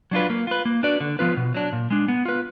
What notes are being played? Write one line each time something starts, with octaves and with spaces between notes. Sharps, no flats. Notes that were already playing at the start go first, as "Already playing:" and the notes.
F#3 D4 F4 B4
A#3
F4 B4
A#3
D4 F#4 B4 D5
D3
F3 B3 F4 B4
B2
F#3 D4
A#2
G#3 D4
B3
F4 B4